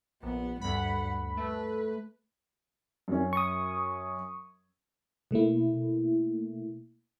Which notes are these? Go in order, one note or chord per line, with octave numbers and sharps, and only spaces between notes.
A#1 B3
D2 G2 F#5 B5
A3 B4
F#2 C#4
C#6 D#6
B2 A3 A#3 E4